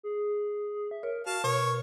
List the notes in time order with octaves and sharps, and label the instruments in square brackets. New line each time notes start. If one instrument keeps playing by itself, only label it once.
[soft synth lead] G#4
E5
[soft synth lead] A#4 [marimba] C#5
[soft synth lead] F#4 [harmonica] F5 A5
[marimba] B2 [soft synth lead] A#4 [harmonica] C#5